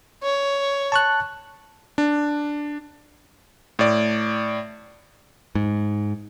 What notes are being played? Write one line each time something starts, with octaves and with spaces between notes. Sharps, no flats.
C#5
A5 C#6 F#6
D4
A2 D5
G#2